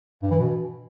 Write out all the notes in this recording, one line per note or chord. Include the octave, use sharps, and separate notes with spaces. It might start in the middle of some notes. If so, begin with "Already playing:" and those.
G2
E3
B2